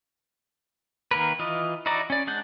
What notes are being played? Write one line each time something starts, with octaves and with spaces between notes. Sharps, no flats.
D#3 A#3 A#4 B4
E3 F4 D#5
D#4 E4 F#4 D5 A#5
C#4 D5
G#3 D4 F#5 G6